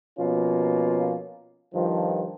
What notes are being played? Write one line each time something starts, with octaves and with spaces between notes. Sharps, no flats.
B2 F3 A#3 C#4 F4
G2 D#3 F3